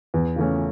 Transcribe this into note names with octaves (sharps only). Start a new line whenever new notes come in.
E2
C#3 E3 A3 C#4